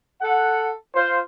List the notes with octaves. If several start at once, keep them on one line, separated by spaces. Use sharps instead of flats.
A4 F#5
F4 C5